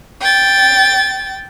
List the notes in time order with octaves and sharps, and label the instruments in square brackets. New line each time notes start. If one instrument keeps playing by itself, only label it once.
[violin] G5 A6